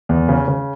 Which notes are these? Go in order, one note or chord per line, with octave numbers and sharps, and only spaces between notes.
E2
C#3
C#3